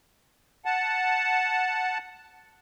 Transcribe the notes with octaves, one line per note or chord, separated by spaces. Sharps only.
F#5 A5